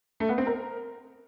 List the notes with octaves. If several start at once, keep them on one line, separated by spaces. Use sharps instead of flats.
A3
B3
C4
A#4